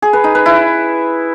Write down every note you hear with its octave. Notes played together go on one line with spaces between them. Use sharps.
G#4
B4
D#4
B4
E4